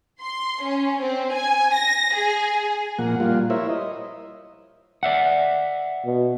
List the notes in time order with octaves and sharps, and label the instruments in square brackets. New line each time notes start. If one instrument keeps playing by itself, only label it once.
[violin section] C6
C#4
C4
G#5
A#6
G#4
[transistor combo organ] A#2 F3 A#3 F#5
G3 A#3 F4
E4 A#4 C5 C#5 E5
D#5
[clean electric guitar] D5 E5 F#5
[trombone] B2